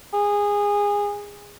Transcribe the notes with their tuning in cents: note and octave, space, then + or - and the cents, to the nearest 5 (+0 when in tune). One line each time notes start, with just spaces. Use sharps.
G#4 -20